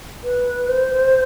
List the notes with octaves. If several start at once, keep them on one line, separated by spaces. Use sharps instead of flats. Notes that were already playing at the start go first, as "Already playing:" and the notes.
B4
C5